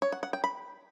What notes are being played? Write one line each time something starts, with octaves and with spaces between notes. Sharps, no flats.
C#5
F#5
F#5
G5
B5